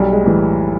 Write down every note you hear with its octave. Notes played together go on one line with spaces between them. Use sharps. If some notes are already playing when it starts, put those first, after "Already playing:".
Already playing: B1 G3
G#3
A2 E3